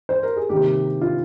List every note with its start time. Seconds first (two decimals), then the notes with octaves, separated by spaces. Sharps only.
0.09 C5
0.23 A#4
0.36 G#4
0.49 C3 D#3 A#3 G4
1.01 F4